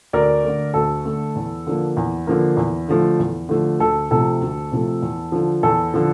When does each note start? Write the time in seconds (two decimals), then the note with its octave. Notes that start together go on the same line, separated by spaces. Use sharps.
0.13 D2 A#4 D5
0.44 D3 A3
0.74 D2 A4
1.05 D3 A3
1.36 E2
1.67 D3 F3 A#3
1.97 E2
2.27 D3 F3 A#3
2.57 E2
2.88 D3 F3 A3
3.19 E2
3.49 D3 F3 A3
3.80 D2 A4
4.11 C3 F3 A3 A4
4.41 D2
4.72 C3 F3 A3
5.02 E2
5.32 D3 F3
5.63 E2 A4
5.94 D3 F3